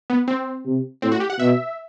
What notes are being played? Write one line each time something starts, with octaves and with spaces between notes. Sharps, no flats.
B3
C4
C3
A2 C4
F#4
G4
F#5
B2 E5